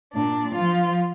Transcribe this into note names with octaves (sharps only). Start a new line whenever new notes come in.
A#2 D4
F3 F4